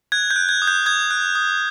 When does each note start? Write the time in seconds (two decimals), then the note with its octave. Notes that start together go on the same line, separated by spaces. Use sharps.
0.12 F#6 G#6
0.31 G6
0.36 F#6
0.49 G#6
0.62 D#6
0.67 G6
0.86 D#6 G#6
1.11 F#6
1.35 D#6